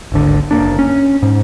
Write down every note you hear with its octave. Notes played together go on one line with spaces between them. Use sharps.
D1 G#1 D3
F#1 G#2 A#3 D4
C#4
G#2